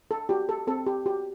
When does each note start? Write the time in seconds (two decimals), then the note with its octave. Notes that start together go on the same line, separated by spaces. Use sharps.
0.11 A4
0.29 F#4 G4
0.49 A4
0.67 C4 A4
0.86 G4
1.06 F#4 G4